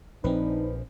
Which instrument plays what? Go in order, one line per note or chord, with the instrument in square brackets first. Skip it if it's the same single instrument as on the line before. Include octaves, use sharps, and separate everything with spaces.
[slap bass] A#1 F3 [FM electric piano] C4 B4 [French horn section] D4 D#4